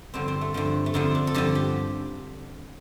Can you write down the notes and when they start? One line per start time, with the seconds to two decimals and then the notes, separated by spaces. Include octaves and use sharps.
0.14 G2 D3 F3 C4
0.28 C4
0.41 A3
0.54 G2 D3 F3 C4
0.86 A3
0.94 F2 D3 F3 C4
1.15 D4
1.27 A4
1.34 G2 D3 F3 G4
1.55 G4